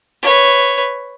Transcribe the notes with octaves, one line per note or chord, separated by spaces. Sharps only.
B4 C#5